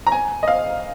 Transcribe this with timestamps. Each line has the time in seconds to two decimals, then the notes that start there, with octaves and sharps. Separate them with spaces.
0.07 A#5
0.12 G#5
0.43 D#5
0.48 F5